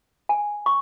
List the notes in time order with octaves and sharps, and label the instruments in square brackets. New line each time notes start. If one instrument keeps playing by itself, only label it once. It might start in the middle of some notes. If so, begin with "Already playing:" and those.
[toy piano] G#5
C#6